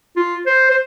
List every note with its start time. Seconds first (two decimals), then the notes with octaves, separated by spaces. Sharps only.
0.16 F4
0.46 C5
0.71 C5